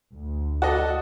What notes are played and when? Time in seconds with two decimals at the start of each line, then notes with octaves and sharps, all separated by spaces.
0.14 D2
0.62 F#4 A4 D5 D#5